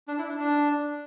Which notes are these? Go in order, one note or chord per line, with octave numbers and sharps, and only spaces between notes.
D4
E4
D4
D4